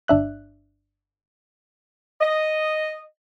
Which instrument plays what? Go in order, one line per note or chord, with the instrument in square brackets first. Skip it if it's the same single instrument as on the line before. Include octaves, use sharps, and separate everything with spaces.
[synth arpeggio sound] G1 D4 E5 F#6
[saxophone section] D#5